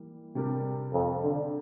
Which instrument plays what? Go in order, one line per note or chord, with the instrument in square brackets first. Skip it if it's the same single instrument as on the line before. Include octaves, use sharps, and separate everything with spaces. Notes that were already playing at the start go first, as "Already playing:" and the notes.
Already playing: [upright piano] E3 G3 A#3 E4
C3 G3 D4 G4 A#4
[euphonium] F2
D3